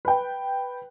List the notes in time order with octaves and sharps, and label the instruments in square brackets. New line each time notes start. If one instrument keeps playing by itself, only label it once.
[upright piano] B4 G5